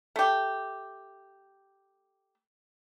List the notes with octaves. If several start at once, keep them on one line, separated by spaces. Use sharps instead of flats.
A3 G4